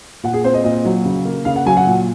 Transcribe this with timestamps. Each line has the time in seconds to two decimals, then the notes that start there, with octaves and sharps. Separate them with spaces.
0.23 A#2 F#5
0.33 G#4
0.44 C4 C5
0.54 D#5
0.64 A#2 D#5
0.85 F#3
1.05 C#3
1.25 A#3
1.45 C#3 F5
1.56 F#5
1.66 F#3 G#5
1.77 F#5
1.87 A#2